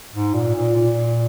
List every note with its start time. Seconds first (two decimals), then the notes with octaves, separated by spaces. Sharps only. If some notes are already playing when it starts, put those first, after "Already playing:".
0.13 G#2
0.34 A#2
0.55 A#2
0.76 A#2